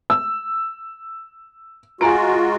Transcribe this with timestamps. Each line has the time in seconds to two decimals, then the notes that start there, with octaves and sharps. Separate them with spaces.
0.10 E6
2.01 G#3 F4 F#4 G#5 A#5 D7